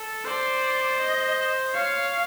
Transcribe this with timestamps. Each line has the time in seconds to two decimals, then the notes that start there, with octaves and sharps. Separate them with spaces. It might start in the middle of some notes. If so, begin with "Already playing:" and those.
Already playing: A4
0.25 C5 D5
0.99 D#5
1.74 C#5 F5